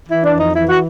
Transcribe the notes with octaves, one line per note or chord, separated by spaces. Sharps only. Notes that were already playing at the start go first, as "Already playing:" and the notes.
E3 E4
D4
F2
D#4
E3 E4
F#4